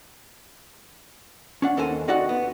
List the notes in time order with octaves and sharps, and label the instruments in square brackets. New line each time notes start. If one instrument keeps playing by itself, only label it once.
[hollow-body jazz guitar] C#4 D4 F#5
D#2 A4 A#4 C5 G#5
C4 D#4 F#4 D5 F#5
B3